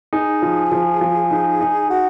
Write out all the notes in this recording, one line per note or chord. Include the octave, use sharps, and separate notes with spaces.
D#4 G#4
F3
F3
F3
D#4
D#4
F#4